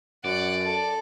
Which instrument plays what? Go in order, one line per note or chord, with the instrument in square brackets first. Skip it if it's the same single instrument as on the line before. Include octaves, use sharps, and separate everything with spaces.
[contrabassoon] F#2 [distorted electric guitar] D5 [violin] F#5
[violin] A4